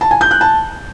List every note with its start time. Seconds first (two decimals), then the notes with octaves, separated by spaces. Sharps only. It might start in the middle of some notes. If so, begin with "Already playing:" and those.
0.01 A5
0.11 G#5
0.21 G6
0.31 F#6
0.41 A5